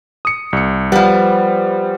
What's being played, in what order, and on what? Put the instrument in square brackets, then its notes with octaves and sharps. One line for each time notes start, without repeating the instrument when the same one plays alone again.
[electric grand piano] D#6 C#7
C2 C#7
[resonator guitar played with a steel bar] F3 B3 [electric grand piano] G3